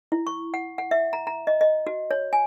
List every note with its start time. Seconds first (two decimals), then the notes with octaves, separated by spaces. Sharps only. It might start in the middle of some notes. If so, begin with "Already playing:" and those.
0.12 E4
0.27 C#6
0.54 F#5
0.78 F#5
0.91 E5
1.13 A#5
1.27 A#5
1.47 D#5
1.61 D#5
1.87 F#4
2.11 C#5
2.33 G#5